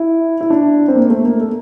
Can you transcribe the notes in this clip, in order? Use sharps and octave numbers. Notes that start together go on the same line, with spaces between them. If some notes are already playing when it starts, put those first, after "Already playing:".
Already playing: E4
E4
D4
C4
A#3
A3
A#3
A4